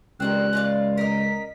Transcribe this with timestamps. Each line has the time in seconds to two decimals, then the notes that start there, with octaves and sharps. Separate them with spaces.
0.20 C#2 D#3 G3 C4 F#6
0.53 G#3 F4 D5
0.97 A#4 D#5 B6